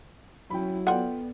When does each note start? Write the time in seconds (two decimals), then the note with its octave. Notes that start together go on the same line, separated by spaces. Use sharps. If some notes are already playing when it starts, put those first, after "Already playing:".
0.50 F#3 C#4 E4 G5 B5
0.87 B3 F4 A4 D5 F#5 G5